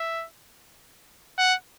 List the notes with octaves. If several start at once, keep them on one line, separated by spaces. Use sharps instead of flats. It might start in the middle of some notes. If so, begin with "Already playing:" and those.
Already playing: E5
F#5